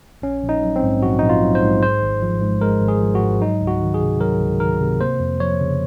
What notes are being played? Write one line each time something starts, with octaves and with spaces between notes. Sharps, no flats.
A#1 C#4
A#1
D#4
F#3
C4
G#2
A#1 F#4
A#1 D#4
F4
F#3
C5
G#2
G#3 C5
G#1
F3
G#2
G#3 A#4
G#1
G#4
F3
F#4
G#2
F#3 D#4
C#2
F#4
D#3
G#4
C3
F#3 A#4
C#2
D#3 A#4
C3
A#3 C5
F2
F3 C#5
C#3